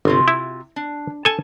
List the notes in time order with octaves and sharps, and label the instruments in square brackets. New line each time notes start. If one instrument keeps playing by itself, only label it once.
[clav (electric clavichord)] G1 [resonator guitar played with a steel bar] C3 F4 F#4
[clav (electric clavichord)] E4
[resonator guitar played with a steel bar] D4
[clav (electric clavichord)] A4 G#5 [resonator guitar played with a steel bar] A5